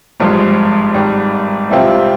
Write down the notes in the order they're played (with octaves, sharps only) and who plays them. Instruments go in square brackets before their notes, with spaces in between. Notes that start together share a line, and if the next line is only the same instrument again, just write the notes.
[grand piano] G#1 G2 F3 G#3
G#1 G#2 G3
C2 C3 G3 C4 F4